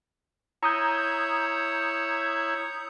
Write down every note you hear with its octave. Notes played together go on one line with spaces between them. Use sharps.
E4 C#5 A#5 D#6 G6